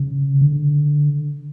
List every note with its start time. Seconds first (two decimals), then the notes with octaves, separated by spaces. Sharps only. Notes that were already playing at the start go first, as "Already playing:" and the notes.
Already playing: C#3
0.41 D3